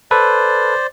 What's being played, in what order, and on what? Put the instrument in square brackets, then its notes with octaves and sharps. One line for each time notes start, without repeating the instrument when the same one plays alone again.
[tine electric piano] A4 B4 [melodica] C5 D5